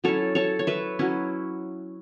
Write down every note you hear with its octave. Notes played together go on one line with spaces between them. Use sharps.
F#3 C#4 E4 A4 C#5
A4 C#5
C#5
B4 E5
F#3 C#4 E4